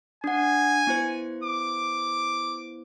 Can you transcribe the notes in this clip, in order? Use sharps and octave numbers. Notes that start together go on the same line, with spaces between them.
D4 F#5 G#5
B3 E4 C5
D6